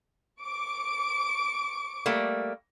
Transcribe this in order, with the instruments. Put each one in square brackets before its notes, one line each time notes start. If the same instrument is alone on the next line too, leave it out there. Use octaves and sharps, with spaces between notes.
[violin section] C#6 D6 D7
[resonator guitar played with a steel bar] G3 A3 A#3